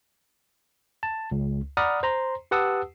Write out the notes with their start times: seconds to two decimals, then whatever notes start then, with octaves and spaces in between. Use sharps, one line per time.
1.03 A5
1.31 C#2
1.77 D5 F#5 A#5 B5 D#6 F6
2.03 C5 A#5 C6
2.51 G4 B4 F#5 A5 D#6 E6